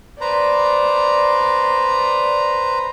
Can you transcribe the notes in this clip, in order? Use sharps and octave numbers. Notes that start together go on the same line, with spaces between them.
B4 C5 D5 A#5